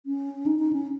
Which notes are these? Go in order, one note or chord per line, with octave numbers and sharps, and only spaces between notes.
C#4
D#4
D#4
C#4